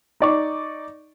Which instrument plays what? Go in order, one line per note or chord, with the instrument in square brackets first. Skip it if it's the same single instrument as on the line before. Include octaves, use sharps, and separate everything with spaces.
[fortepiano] D#4 D5 C#6